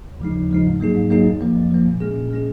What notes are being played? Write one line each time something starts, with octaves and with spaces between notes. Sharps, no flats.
D#2
C#3 F3 G#3 D#4
D#2
C#3 F3 G#3 D#4
G#2
F#3 A#3 D#4 G#4
G#2
F#3 A#3 D#4 G#4
F2
F3 A#3
F2
F3 A#3
A#2
G#3 C#4 G#4
A#2
G#3 C#4 G#4